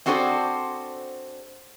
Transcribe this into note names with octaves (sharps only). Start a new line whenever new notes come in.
C4 D4 F#4 G#4 A4 C5